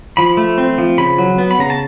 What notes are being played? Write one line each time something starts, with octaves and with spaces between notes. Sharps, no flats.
F3 B5
A3
C4
F3
C#3 B5
F#3
B3
B5
C#3 A#5
A5